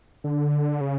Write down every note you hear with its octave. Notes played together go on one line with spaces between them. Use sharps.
D3
C#3